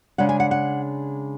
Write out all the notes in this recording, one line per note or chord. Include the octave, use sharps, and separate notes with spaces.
C#3 G#3 D4 F#5
G#5
F#5
F#5